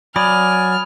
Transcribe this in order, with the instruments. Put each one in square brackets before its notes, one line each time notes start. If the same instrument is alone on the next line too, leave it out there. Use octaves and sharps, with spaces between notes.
[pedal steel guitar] F#3 D5 [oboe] G#5 [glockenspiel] B5 D#6 [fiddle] F6